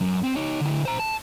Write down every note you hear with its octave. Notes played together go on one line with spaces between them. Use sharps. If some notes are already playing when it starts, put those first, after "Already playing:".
F#2
C4
D#4 C#5
D3 E4
C5 A#5
A5